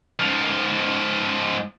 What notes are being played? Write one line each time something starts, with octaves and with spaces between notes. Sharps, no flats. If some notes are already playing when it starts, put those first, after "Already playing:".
G#2 F3